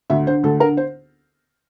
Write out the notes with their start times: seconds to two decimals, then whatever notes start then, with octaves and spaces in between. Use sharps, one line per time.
0.10 D2 E5
0.27 D3 C5
0.43 D2 A4
0.60 D3 A#4
0.77 C5